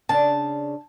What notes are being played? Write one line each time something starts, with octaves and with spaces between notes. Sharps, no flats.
C#3 D4 A5